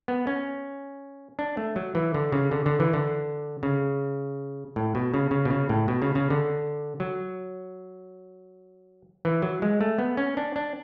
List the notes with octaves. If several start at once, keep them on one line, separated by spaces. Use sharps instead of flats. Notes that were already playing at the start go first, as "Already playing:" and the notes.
B3
C#4
D4
A3
F#3
E3
D3
C#3
D3
D3
E3
D3
C#3
A2
B2
C#3
C#3
B2
C#3
A2
B2
C#3
C#3
D3
F#3
E3
F#3
G#3
A3
B3
C#4
D4
D4